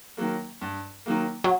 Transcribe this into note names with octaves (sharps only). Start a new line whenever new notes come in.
D#3 F#3 A#3
G2
D#3 F#3 A#3
F#3